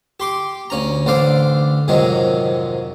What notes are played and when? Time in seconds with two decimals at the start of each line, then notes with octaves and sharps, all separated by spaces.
0.20 G4 C6 D6
0.70 D2 C#4 A#5
1.06 A1 D3 C5 D5 F5 D6
1.88 F2 G#2 C3 D#3 F#3 G#3